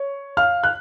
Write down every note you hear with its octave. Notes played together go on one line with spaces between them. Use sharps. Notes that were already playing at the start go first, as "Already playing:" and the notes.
Already playing: C#5
F5 F6
F#6